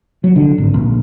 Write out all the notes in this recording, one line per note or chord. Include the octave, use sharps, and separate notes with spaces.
F#3
D3
G#1
A#1